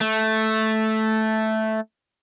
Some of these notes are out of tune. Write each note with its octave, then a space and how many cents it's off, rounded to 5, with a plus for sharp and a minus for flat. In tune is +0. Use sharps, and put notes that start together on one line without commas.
A3 -5